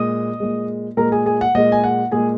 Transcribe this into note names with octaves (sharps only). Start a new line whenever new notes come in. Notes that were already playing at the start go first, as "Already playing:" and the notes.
Already playing: A#2 G#3 D#5 D#6
A#2 G#3
A#2 G#3 A#4 A#5
G#4 G#5
G#4 G#5
F#5
A#2 G#3 D#5
G#5
F#5
A#2 G#3 G#4 G#5